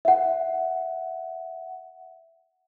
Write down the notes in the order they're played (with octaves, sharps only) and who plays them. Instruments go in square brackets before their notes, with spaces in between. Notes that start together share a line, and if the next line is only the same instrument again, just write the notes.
[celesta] E5 F#5